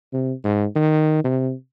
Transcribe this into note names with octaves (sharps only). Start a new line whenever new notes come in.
C3
G#2
D#3
C3